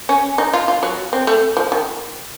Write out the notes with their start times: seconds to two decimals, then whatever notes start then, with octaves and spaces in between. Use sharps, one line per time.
0.09 C#4
0.38 D#4
0.53 F4
0.68 F4
0.83 F#3
1.13 C4
1.27 A3
1.57 F3
1.72 D#3